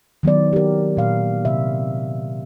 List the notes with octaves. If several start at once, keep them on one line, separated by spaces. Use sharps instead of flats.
D#3 F#3 B3 D5
G4 A#4
A#2 F5
C3 E5